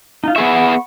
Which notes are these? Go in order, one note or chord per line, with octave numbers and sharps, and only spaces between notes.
D#4 F4
B3 G#4 E5 F#5 B5 C#6